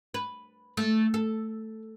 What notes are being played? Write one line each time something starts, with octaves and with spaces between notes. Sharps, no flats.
B4
A3
A4